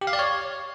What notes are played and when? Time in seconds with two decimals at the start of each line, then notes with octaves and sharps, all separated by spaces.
0.01 G4
0.07 F5
0.13 D5
0.19 C#5